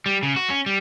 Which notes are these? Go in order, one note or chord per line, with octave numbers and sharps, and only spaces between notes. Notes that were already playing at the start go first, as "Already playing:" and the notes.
G3
C#3
F#4
C#4
G3